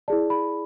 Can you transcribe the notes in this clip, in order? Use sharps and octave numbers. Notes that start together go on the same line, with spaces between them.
E4 G#4 D5 A5
B5